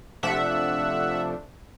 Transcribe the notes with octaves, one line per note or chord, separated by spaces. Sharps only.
C3 F3 A3 D4 E5 F#5